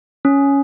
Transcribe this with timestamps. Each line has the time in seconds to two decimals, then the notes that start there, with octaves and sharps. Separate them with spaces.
0.25 C#4